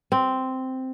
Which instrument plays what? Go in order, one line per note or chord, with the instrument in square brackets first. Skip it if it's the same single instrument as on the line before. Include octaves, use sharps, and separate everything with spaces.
[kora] C4